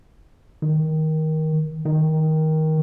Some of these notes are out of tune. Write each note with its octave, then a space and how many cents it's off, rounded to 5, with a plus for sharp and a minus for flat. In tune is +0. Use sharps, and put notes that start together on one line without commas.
D#3 +15
D#3 +15